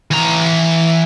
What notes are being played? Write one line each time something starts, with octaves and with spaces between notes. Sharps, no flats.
E3 A#5